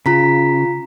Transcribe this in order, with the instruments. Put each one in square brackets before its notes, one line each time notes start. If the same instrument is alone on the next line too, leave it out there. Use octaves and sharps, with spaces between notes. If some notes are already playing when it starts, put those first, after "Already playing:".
[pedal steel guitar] C#3 [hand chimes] F4 A#5 B6